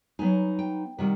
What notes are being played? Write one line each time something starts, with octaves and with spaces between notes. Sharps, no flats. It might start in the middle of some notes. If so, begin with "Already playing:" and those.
F#3 B3 D#4 G#5
G5
C3 D#3 G3 F#5